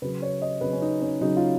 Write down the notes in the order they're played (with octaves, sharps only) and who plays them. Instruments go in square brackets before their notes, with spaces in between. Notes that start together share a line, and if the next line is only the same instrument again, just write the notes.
[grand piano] C#3 F#3 B4
C#5
D#5
C#3 F#3 B4
C#4
D#4
C#4
C#3 F#3 D#4
F4